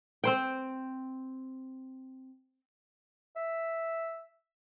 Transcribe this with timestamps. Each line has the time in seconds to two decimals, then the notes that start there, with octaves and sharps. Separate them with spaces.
0.24 C4 C5 G5
3.36 E5